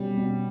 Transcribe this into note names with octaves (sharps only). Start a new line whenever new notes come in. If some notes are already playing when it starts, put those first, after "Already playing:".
Already playing: B2 G3 C#4
B2